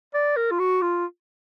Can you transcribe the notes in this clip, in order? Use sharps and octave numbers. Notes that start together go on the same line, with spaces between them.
D5
A#4
F4
F#4
F4